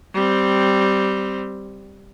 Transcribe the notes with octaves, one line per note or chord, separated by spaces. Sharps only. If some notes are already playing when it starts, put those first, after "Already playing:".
G3 C4